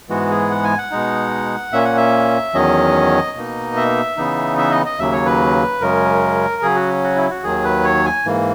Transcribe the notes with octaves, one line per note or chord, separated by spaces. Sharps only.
G#2 E3 G#3 B3 F#4
G#4
F#5
G#5
F#5
B2 G#3 D#4
A#2 A#3 C#4 E5
F#5
E5
E2 D#3 F#3 C#4 D#5
B2 A#3 D#4
E5
C#3 E3 B3 D#4
E5
D#5
D#5
D#2 C#3 F#3 A#3 E5
C#5
B4
F#2 C#3 G#3 C#4 A#4
C#3 F#3 C#4 G#4
F#4
F#4
E4
F#4
D#2 D#3 F#3 G#4
B4
C#5
G#5
G#2 E3 A#3